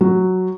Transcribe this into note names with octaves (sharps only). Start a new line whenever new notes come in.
F#3